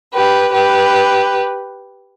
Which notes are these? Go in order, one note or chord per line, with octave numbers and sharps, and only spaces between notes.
G4 B4
G4 B4